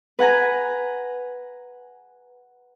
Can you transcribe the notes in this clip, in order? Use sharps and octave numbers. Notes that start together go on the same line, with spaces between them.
B4 F#5 G#5 A#5